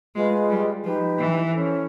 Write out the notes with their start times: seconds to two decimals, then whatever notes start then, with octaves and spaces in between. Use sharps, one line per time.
0.15 G#3 F4 G#4 B4 D#5
0.50 G3
0.84 F3 D#4 G4 B4
1.19 E3
1.52 C#4 E4 A4 C5